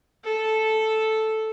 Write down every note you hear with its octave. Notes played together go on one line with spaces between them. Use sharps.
A4